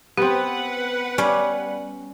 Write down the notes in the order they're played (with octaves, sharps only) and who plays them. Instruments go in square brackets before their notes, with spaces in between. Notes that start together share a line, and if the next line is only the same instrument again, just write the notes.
[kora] B3 C4 [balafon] G4 [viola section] B4 F#5
[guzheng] G3 [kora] C#4